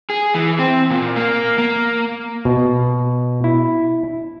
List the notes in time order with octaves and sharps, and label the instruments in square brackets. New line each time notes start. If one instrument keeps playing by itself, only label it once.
[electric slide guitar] G#4
E3
C4
A#2
A#3
A#3
[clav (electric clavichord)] B2
E4